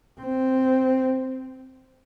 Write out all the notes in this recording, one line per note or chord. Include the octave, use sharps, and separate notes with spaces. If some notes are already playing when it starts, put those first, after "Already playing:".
C4